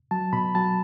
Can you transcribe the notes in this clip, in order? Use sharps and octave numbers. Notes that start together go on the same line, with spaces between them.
F#3 A5
B2 B5
F#3 A5